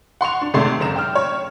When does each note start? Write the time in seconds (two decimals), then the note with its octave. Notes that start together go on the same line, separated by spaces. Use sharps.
0.21 F#5 C6 C#6 F7
0.41 D4
0.54 G#1 C3 G#3 A3 C6
0.80 F#1 A#5 E7
0.96 G5 F6
1.15 C#5